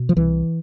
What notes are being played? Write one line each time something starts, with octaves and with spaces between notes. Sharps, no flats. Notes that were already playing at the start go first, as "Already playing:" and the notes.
Already playing: B2
F3
C2 E3